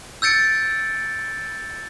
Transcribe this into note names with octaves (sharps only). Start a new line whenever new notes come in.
E6 G6 A6 C#7 D7